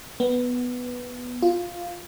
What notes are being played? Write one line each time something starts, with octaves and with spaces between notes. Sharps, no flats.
B3
F4